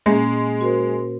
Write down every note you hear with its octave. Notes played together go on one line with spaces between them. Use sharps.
A#2 G#3 A#3 C#4
F#4 A#4 C5